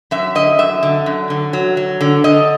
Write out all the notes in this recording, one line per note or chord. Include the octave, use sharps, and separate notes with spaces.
F#2 E5
D3 D#5
F#2 E5
D3
F#2
D3
F#3
F#3
D3
D3 D#5